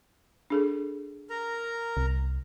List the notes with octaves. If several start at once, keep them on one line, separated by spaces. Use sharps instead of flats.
D4 G#4 A4
A#4 A#5
C2